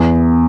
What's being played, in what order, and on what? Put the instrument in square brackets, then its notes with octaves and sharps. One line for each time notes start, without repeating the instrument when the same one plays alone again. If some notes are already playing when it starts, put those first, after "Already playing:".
Already playing: [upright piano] E2